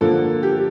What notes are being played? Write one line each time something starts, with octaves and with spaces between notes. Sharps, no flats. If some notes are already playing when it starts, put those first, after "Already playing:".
D3 F3 A#3 A4
G4